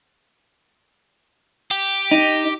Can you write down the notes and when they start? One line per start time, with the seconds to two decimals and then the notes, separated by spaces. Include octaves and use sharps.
1.71 G4
2.11 D#4